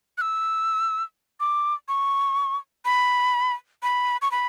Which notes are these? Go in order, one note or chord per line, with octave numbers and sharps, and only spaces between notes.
F#6
E6
D6
C#6
B5
B5
C#6
B5